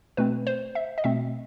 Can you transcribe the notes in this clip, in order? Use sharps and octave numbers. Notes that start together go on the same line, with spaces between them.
B2 A3 C4 B4
C5
E5
D#5
B2 A3 C4 E5